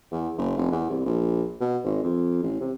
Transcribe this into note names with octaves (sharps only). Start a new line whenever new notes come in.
E2
F#1
F1
E2
C2
A#1
B2
G#1
F2
A1
C3